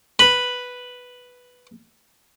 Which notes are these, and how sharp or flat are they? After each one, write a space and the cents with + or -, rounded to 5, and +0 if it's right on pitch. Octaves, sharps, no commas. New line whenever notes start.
B4 +0 B5 +0